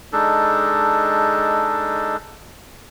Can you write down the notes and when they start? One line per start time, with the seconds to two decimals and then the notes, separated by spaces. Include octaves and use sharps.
0.13 G#3 D4 D#4 A4